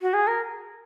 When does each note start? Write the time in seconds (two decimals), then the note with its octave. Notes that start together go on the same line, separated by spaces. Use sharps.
0.02 F#4
0.14 G#4
0.27 A#4